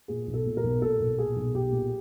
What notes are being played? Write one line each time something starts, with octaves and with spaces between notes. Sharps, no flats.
A#2 G#4
B1
A4
A#2
A#4
B1
A#2 A4
B1
A#2 G#4
B1
B1 G4
A#2